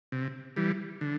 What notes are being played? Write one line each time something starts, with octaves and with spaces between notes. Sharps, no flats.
C3
E3 G3
D3